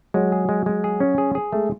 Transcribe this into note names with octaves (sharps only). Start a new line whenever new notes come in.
F#3 G#3
G#4
G#3
G#3
G#4
C#4
G#4
G#4
G#3 A3